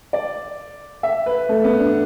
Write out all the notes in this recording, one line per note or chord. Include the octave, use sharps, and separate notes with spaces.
D5
E5
B4
A3
B3
D4